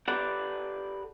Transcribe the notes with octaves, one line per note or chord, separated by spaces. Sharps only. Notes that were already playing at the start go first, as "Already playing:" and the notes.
G4 A4 B4 D5 F#5